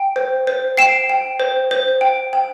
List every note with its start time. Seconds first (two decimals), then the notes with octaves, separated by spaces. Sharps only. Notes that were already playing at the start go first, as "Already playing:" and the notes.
Already playing: G5
0.16 C5
0.47 C5
0.77 G5 C7 E7
1.09 G5
1.40 C5
1.71 C5
2.01 G5
2.33 G5